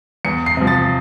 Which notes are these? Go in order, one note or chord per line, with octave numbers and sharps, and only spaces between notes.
E2 C#7
C7
C3 F3
A6